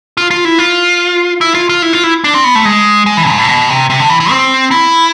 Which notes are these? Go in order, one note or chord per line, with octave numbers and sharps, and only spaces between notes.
F4
F4
E4
F4
E4
F4
F4
E4
F4
E4
D4
C4
B3
A3
G#3
G#3
E3
G#2
A2
B2
C3
C3
D3
E3
E3
C4
E4